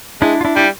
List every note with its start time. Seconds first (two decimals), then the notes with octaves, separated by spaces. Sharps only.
0.21 G#3 D4 E4
0.41 F4
0.45 D4 E4
0.56 G3 E4